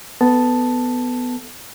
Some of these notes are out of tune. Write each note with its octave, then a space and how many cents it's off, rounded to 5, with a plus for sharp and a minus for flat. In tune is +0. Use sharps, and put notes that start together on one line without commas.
B3 +10 A4 +0 A5 +0